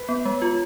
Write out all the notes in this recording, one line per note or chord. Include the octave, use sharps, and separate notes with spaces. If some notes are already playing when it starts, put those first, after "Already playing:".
Already playing: B4
B3
G#3
F4